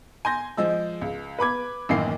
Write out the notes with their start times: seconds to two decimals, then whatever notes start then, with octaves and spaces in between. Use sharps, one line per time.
0.25 G#5 C6 G6 A#6
0.57 F3 G#3 E6
1.01 C#2
1.39 B4 B5 D6 G#6
1.89 A1 F#2 D#3 E3 A#3 C7